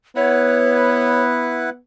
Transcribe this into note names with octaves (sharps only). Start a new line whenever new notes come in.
B3 E4 B4 C#5 F#5